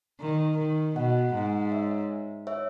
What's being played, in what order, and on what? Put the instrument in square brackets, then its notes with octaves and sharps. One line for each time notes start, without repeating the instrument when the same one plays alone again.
[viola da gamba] D#3
D#3
[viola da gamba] B2 [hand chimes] D#5 F#5
[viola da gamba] G#2
[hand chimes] C#5 E5
C#5 E5